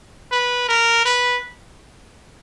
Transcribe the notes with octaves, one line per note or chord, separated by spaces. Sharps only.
B4
A#4
B4